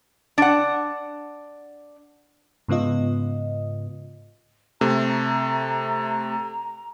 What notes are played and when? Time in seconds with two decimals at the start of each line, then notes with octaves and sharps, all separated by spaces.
0.38 D4 F#5
2.68 G#2 C#3 B3 F4 D#5
4.81 C3 A3 A#5